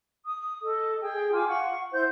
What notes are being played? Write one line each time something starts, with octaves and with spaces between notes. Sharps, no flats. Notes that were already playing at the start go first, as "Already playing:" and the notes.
D#6
A4 D#5
G#4 G5
F4 G#5 D6
F5 F#5 C#6
E4 C5 G6